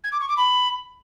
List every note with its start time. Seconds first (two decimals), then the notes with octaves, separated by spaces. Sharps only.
0.04 G#6
0.12 D6
0.20 C#6
0.29 D6
0.37 B5